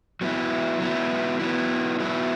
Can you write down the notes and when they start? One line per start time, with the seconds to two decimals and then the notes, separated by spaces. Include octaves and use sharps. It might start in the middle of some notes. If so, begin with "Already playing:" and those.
0.21 F#3 B3 E4
0.79 F#3 B3 E4
1.39 F#3 B3 E4
1.99 F#3 B3 E4